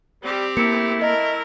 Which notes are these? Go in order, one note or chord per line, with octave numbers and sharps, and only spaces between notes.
G3 C4 G4
A3 A#3 E4 C#7
A#4 D#5